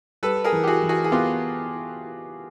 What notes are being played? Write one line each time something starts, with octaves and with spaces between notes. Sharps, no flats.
G3 A4 B4
G#4 A#4
E3
G4
F#4 G#4
E3
F#4 G#4
G#4
B3 F4 G4